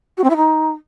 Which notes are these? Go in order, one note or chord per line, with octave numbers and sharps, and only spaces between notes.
F#4
C4
E4
D#4